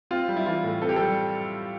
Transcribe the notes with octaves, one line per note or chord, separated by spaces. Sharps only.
C4 F4
G3
E4
E3 F4
A2
C4 A4
G4
A4
G3